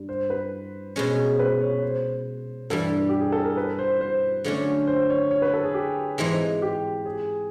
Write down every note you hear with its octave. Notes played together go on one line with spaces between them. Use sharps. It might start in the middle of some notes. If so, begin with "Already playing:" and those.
Already playing: G2 G3
C5
B4
B2 G#3 C#4
C5
B4
C#5
C5
G2 E3 G3 A4
G4
G#4
A4
A#4
B4
C5
C5
D3 F#3 A3 C#4
C5
C#5
C#5
B4
A4
G#4
G4
G#2 E3 G#3 C4 D#4
G4
G#4